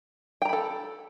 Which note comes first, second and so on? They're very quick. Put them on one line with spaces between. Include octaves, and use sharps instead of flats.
G5 A#5 B5 A4